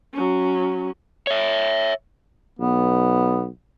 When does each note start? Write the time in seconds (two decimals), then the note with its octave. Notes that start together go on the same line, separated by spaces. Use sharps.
0.14 F#3 C#4
1.27 C#5 E5
2.59 B1 B3